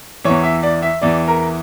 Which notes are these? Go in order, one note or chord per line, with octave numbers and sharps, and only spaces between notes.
E2 E3 C#5
E5
D5
E5
E2 E3 D5
A#4